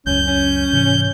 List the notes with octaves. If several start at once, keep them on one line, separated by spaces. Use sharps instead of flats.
C#2 F#2 C#4 G6
C#4
G#2 C3 E3